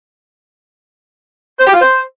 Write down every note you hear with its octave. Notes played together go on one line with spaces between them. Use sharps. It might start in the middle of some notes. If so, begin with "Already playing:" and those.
C5
G4
F4
C5